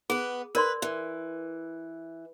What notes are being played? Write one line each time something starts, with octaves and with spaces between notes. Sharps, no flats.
B3 G#4 B4
A#4 B4 D5 C6
E3